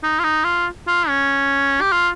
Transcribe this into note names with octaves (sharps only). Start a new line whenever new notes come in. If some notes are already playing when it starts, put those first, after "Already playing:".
D#4
F4
D#4
F4
F4
C#4
G4
F4